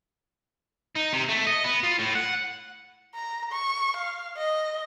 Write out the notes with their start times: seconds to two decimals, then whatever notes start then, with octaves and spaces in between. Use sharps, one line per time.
0.96 D#4
1.13 C3
1.29 A3
1.47 D#5
1.64 B3
1.83 F4
1.99 A2
2.15 F#5
3.15 A#5
3.52 C#6
3.97 F5
4.37 D#5